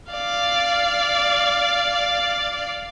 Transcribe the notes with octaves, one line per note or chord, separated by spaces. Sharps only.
D5 F5